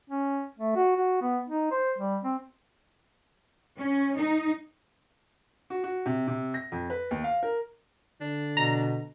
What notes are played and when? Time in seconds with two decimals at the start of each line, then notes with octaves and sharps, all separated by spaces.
0.10 C#4
0.59 A3
0.76 F#4
0.96 F#4
1.21 B3
1.49 D#4
1.71 C5
1.98 G3
2.24 C4
3.78 C#4
4.16 D#4
5.70 F#4
5.84 F#4
6.06 C3
6.27 C3
6.54 A#6
6.72 F2
6.90 B4
7.11 D#2
7.24 F5
7.43 A#4
8.21 D3 D4
8.57 B2 A#5